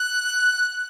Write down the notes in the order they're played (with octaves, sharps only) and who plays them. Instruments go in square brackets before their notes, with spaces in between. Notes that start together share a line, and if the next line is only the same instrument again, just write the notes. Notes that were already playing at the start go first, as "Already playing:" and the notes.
Already playing: [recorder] F#6